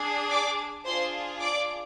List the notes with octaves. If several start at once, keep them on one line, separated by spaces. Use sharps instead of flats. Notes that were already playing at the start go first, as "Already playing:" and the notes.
Already playing: D4 G#4
D5 D6
D4 F4 G#4 C5 C6
D5 D6